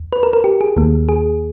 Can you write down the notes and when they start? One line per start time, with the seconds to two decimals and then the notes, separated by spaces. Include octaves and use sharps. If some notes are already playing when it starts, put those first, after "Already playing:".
Already playing: E2
0.13 B4
0.23 A#4
0.33 A#4
0.44 G4
0.61 G#4
0.76 D#2 D#3 A#3
1.09 G#4